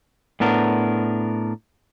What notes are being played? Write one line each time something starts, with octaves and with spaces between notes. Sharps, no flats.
A2 B3 D4 A#4